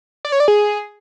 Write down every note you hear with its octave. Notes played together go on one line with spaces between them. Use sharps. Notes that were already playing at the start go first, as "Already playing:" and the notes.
D5
C#5
D5
G#4